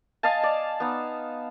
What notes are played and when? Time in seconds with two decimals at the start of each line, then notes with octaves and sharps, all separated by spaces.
0.23 D#5 F5 G#5 A5
0.43 D5
0.80 B3 D#4